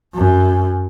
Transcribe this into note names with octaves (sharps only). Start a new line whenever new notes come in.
F#2